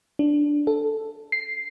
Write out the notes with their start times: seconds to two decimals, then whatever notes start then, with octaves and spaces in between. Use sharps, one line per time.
0.19 D4
0.67 A4
1.32 C7